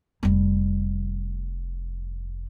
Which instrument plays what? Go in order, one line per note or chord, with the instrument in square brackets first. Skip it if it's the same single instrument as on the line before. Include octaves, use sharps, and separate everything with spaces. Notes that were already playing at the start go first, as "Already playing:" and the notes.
[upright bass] F1 G3